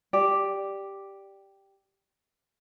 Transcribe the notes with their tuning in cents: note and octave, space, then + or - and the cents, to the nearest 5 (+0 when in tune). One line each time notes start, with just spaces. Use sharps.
G4 +0 D5 +0